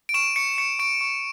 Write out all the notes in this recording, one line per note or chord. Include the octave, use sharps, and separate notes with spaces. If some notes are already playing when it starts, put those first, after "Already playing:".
D7
C#6 E7
C#6 C#7
C#6 C#7
C#6 D7
C#6